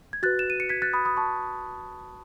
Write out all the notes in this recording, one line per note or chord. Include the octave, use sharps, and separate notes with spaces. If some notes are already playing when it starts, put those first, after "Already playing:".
G#6
F#4 B4 F#6 A6
E7
D#7
C#7
G#6 B6
F#6 A6
B5 D#6
B5 D#6
A5 C#6